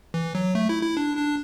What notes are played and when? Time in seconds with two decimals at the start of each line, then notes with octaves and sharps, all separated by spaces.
0.14 E3
0.35 F#3
0.55 A3
0.69 E4
0.83 E4
0.97 D4
1.17 D4